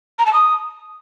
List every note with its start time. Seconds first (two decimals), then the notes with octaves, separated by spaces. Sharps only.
0.18 A#5
0.26 A5
0.33 D#6